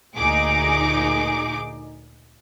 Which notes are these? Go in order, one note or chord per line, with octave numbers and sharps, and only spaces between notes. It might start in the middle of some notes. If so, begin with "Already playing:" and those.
D2 A#2 D#4 G#4 D6